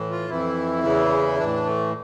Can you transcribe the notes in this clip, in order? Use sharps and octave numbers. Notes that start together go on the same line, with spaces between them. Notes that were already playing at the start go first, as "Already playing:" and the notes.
Already playing: A2 E3
F4
F2 E3 E4
E2 C#3 E3
A2 E3 D4
A3